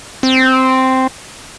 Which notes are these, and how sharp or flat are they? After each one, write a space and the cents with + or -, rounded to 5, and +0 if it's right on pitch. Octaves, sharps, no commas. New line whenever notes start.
C4 -5